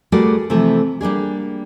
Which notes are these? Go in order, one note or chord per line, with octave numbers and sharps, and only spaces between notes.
G3 A3 F#4 G#4 A#4 D5
C3 E3 F3 A3
G3 A#3 D4 G#4